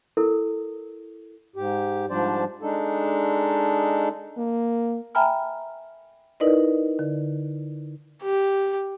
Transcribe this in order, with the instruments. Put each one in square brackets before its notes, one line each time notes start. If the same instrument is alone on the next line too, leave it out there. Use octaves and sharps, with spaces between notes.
[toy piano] E4 A4 A#4
[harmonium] G#2 G4
G#2 F3 G3 D4 C5 D5
G#3 D4 D#4 A4
[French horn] A#3
[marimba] E5 G5 G#5 A#5 B5 F6
D#4 E4 A#4 B4 D5 D#5
D3
[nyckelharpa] G4